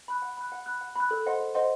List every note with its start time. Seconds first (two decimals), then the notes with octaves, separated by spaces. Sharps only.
0.08 B5 F#6
0.22 F#5
0.37 B5 F#6
0.52 F#5
0.66 B5 F#6
0.81 F#5
0.96 B5 F#6
1.11 A4
1.26 C5 D#5 F#5 C6
1.40 A4
1.54 C5 D#5 F#5 C6